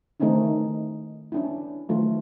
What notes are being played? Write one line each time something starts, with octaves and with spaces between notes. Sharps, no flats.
D#3 A3 C4 C#4 D#4 E4
C#4 D4 E4
D#3 F#3 A3 F4